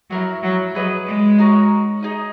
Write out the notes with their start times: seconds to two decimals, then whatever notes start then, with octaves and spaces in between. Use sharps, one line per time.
0.10 F#3 E4 A#4 C#5
0.43 F#3
0.74 F#3 G#4 B4 D#5
1.07 G#3
1.38 D#4 F#4 A#4 C#5
2.03 D#4 G#4 D#5